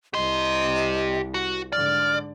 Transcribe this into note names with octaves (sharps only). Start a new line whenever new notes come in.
C2 G4 D#5 C6
F#4
G#2 D3 D5 F6